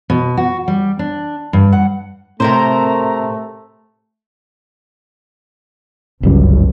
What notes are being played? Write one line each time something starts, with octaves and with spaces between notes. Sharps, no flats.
B2
F#4
G3
D4
G2
F#5
A2 C3 A3 C4 A#4 C5 A#5
G1 C#2 F#2 G3